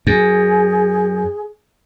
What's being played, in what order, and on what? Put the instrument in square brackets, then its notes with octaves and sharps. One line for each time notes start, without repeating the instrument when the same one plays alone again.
[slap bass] F#2 [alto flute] G#4